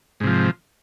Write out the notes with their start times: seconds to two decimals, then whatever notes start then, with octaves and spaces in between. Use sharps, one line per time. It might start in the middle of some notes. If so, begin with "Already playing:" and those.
0.20 G#2
0.24 C3
0.27 F3